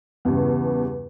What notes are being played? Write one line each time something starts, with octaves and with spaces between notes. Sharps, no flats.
E2 G2 C#3